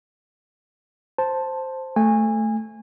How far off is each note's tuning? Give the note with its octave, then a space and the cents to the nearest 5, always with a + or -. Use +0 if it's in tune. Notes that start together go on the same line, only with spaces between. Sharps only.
C5 +0 A5 +0
A3 +0 G#5 -25